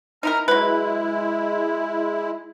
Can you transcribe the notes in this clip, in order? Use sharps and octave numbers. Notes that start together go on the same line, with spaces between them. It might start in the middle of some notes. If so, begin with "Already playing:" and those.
D#4 E4 A#4 A#5 F6
F#3 G#3 E4 B4